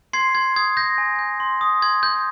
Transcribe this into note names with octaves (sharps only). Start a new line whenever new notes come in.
C6 G#6 C7
C6 G#6
D#6 G#6
G6 A#6
G#5
G6
C6
D#6
C6 G#6
C6 G6